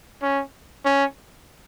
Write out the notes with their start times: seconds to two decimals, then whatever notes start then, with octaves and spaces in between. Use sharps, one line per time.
0.22 C#4
0.85 C#4